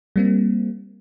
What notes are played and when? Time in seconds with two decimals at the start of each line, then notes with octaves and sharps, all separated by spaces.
0.16 G3 A#3 C4